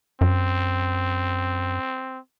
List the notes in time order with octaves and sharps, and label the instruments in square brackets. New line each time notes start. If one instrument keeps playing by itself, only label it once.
[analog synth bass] F#2 [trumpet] C4